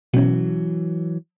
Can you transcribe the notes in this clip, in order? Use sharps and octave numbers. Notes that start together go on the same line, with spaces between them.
B2 E3 F#3 C#4